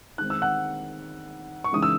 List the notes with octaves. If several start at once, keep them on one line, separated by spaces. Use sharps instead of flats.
D#3 G#3 C4 F#6
E6
F#5 F#6
C#6
C#3 E3 G#3 D#4 D#6
E6